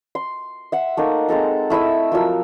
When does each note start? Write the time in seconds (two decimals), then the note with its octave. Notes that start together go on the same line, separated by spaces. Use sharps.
0.15 C6
0.72 E5 F#5
0.97 A3 A#3 D#4
1.29 G#3 C4 A4 A#5
1.70 A3 E4 D#5 E5
2.12 F3 F#3 A#4 E6